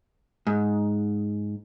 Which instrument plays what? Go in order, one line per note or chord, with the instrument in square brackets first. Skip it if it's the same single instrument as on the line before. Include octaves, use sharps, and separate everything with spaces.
[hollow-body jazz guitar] G#2